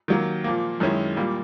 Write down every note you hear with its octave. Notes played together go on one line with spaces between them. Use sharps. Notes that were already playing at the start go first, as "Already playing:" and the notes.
D#3 F#3 A#3
A#2 F3 A#3
F#2 D#3 G#3 C#4 E4
A#2 G3 A#3